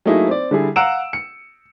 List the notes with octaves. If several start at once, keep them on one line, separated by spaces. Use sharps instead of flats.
F#3 A3 A#3 D#4 E4 G#4
C4 D5
D3 G3 E4 G#4
F5 F#5 A#5 E6 D7 E7
C#7